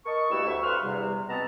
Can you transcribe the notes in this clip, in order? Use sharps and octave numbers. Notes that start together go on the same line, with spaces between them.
A#4 D#5 A5 C#6
G2 G3 A3 E4 F#4 E6
D2 E5 C#6
G2 C4 B4 F5 C6 F6
E2 C3 G3
B2 G#3 B3 C4 A5 A#5